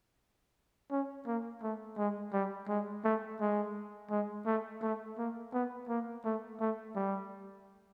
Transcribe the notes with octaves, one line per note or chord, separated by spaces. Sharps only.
C#4
A#3
A3
G#3
G3
G#3
A3
G#3
G#3
A3
A3
A#3
B3
A#3
A3
A3
G3